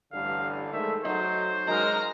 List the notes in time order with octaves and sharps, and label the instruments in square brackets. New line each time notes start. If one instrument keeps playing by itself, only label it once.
[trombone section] A1 G2 D3 [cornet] F5
[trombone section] A#1 G#3 A3 [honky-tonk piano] D#3 [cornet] E5
[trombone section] F#3 [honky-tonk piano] A3 D#4 [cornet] C5
[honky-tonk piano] D#3 D#4 A#4 [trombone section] F#3 G#3 [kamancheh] A#5 F6